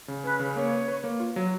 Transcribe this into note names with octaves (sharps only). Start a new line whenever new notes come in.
C#3
C#4 B4
C#3
A#3 C#5
B4
B4
A#3
F4
F#3